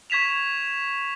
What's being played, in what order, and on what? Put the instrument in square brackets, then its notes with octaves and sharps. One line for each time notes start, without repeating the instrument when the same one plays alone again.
[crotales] C#6 G#6 B6 E7 F7